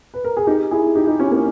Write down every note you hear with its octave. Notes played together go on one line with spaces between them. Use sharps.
B4
A#4
G#4
D#4 G4
E4 G#4
D#4 G4
D#4 G4
C#4 E4
A#3 C#4